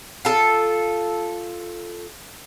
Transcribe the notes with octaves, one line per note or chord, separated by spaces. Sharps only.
F4 A4